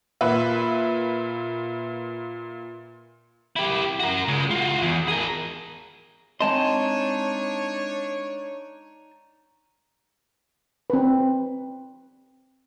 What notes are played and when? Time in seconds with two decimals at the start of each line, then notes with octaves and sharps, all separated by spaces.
0.21 A#2 B4 E5
3.56 E4 G4
4.00 F#4 A#4
4.28 C#3 G#3
4.51 F4 F#4
4.82 E2
5.08 G#4 A#4
6.41 G#3 C4 D4 D#4 C#5 D#5 A5 C6
10.90 C4 B4